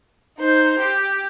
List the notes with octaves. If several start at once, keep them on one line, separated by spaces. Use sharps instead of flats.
D#4 C5
G4